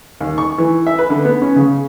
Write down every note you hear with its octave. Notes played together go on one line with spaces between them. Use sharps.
D#2
C#6
E3
E5
B4
D3
B3
C#4
C#3